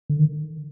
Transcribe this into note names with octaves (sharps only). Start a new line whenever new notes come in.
D3
D#3